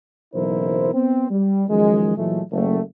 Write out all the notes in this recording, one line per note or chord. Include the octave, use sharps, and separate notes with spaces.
F#1 B1 E3 E4 A#4 C5
B3 C4
G3
F#2 D#3 F3 G#3
A#2 E3 F#3 G#3 A3
F#1 A3